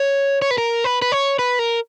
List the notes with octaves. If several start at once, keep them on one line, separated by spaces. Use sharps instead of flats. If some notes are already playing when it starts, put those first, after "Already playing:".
Already playing: C#5
C#5
B4
A#4
B4
B4
C#5
B4
A#4